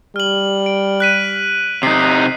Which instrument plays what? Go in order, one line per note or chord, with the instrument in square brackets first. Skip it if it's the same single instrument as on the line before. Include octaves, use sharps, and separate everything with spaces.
[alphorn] G3 [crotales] F6 F#7
[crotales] D7
F#6 B6 D#7
[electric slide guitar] C3 D#4 [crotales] C7